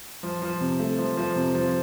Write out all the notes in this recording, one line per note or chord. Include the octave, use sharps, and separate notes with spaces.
F3
F3
C3
A3
F3
F3
C3
F3